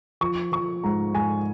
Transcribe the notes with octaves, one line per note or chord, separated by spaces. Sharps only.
F3 C#6
F3 C#6
G#2 A#5
G#2 G#5